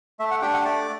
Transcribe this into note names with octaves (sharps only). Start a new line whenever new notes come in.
A3 E5
F#5
D4 G4 G5
F#5
A3 D5